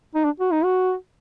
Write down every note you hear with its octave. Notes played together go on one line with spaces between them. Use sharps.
D#4
D4
F#4
D#4
F#4